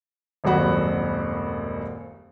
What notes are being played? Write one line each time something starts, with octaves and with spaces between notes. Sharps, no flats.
D#1 G#1 F#2 F#4 F#5 B5